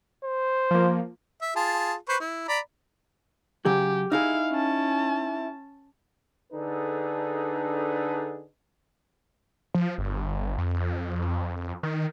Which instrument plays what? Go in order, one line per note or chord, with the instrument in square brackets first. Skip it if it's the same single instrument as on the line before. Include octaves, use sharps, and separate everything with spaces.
[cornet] C5
[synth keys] F3 A#3
[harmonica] E5
F4 G#4 A5
B4 C5 C#6
E4
D5 A#5 B5
[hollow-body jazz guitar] C#3 F#3 G#4 [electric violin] G4
[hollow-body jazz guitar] D#4 E4 G#4 [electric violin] F5
[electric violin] C#4 A5
[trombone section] D3 D4 D#4 G#4 A4 B4
[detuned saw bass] F3
G1
F2
D#3